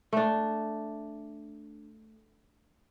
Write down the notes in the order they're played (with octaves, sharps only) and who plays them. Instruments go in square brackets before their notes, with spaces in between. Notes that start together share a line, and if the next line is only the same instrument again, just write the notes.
[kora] A3 D4